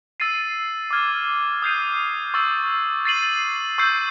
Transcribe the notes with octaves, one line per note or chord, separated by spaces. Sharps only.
E6 A6 C7 D#7
D6 F6 G#6
D#6 G6 C7 D#7
C#6 E6 A6
A6 C7 D#7 F#7
C#6 E6 G6 C7